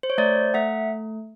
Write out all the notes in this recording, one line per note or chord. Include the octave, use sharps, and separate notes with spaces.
C5
C#5
A3 C5 D5
A3 E5 F#5